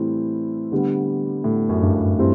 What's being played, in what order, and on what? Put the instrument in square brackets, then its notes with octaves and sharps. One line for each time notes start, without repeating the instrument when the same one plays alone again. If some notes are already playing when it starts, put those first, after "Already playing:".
Already playing: [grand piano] A2 [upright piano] E3 G3 C4 E4
[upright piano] D3 G3 B3
[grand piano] A2
F#2
G2
F#2
[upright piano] E3 G3 C4